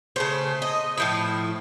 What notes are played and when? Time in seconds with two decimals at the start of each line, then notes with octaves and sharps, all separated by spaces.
0.16 C#3 A3 C5
0.62 D#5
0.98 A2 F3 E4